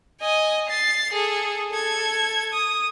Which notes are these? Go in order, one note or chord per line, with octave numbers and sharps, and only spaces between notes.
D#5 G#5
A6 C7
G#4 A4
A4 G#6
D#6